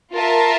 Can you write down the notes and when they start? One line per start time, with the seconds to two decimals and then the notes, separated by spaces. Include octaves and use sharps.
0.13 F4 A#4 E5 A5